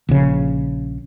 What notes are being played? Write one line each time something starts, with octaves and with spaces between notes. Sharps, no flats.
A#1 C#3